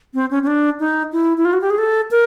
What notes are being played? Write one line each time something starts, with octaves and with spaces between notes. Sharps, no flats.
C4
C#4
C#4
D4
D#4
E4
E4
F4
F#4
G4
G#4
A4
A#4